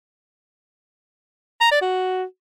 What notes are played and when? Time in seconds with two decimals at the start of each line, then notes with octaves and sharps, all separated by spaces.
1.61 A#5
1.71 D5
1.82 F#4